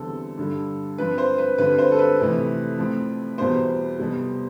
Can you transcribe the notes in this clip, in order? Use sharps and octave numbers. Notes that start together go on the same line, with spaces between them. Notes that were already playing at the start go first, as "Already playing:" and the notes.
Already playing: E2 D3 G3 C4 A4
G2 D3 G3
G2 F3 C4 B4
C5
B4
G2 D3 G3 C4 B4
C5
A4
B4
F2 C3 E3 A3 C4
A2 F3 C4
E2 B2 G3 B3 C5
F2 C3 G3 B3